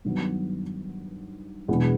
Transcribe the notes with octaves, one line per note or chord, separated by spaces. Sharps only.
G2 D#3 F#3 B3
E2 B2 G#3 B3 D4